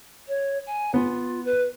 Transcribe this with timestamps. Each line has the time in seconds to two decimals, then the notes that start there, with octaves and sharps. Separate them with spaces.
0.27 C#5
0.66 G#5
0.94 B3 F4
1.45 B4